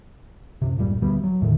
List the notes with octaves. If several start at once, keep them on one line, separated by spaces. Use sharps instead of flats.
F#2 C3
E1 G2 A#2 G3
D2 G3 B3
F#3
E2 A2 D3 D#3